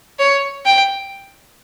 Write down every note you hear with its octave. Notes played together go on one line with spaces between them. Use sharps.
C#5
G5